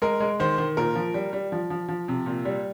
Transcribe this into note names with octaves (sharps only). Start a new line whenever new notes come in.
G#3 A#4
G#3
D#3 C5
D#3
A#2 A#4
F3
G3
G3
F3
F3
F3
C3
A#2
G3